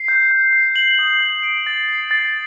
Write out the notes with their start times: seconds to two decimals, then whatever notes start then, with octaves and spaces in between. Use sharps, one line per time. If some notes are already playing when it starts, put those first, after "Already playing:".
Already playing: C7
0.08 G6
0.31 G6
0.53 C7
0.76 F#7
0.99 D#6
1.21 G6
1.43 D7
1.66 A6
1.89 C7
2.11 A6